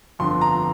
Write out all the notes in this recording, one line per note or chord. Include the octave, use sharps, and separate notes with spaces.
G1 F2 D3 F3 C6
A#5